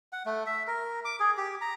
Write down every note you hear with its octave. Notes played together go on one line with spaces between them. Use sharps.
F#5
A3
E5
A#4
D6
G#4
G4
A#5